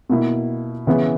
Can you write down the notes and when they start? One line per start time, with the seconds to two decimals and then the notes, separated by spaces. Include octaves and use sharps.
0.09 B2 A#3 E4
0.87 C#3 E3 B3